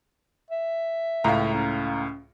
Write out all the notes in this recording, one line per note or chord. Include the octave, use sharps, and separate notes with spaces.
E5
C#2 A2 F5 A#5
C#4